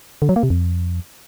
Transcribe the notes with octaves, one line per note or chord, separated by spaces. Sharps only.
D3
F#3
A#3
C3
F2